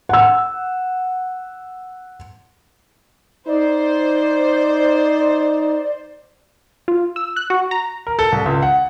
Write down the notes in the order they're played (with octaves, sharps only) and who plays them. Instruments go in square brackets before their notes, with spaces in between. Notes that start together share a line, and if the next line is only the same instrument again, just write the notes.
[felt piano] F#5 E6
[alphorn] D#4 [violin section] C5 [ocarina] D5
[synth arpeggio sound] F4
E6
F#6
F#4
A#5
[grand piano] A#4
A4
C2
C#2
F#5